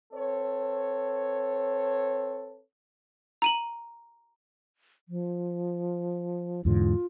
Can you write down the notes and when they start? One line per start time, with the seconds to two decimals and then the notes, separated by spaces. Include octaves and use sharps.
0.13 C4 A4 B4 C#5
3.42 A#5 D#7 F#7
5.09 F3
6.65 E2 G#2 D3 F4